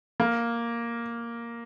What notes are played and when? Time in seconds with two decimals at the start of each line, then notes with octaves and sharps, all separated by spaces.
0.20 A#3